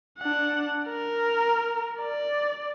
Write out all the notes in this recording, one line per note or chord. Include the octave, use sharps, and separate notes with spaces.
D4 F#5
A#4
D5